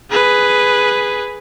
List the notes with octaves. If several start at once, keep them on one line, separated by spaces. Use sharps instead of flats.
G#4 B4